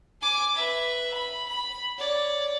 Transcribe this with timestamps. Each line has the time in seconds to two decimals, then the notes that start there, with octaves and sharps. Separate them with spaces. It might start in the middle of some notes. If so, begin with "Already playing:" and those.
0.21 G#5 D6
0.55 B4 E5
1.13 B5
1.48 B5
1.98 C#5 D5